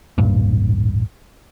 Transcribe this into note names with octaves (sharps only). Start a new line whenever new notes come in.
D1 A1 G2 A#2